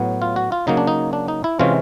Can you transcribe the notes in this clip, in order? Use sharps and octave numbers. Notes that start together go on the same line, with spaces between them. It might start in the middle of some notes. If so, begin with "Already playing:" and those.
Already playing: A2 F#3 B3
F4
F#4
F4
C#3 F#3 A#3 D#4
D4
D#4
D4
D#4
E4
C3 E3 G#3 C#4 F4